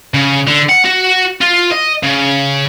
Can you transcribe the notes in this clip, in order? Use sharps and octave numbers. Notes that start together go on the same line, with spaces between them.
C#3
D3
F#5
F#4
F4
D#5
C#3